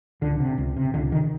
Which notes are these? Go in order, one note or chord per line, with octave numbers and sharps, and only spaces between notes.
C#2 D3
C3
C#2
C3
C#2 D3
C3 D#3